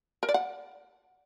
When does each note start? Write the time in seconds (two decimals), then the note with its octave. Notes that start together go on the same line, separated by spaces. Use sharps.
0.23 A#4
0.29 D5
0.34 F#5